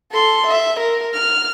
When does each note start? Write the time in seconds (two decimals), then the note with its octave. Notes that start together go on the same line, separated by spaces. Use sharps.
0.12 A4 C6
0.47 E5
0.80 A#4
1.14 F6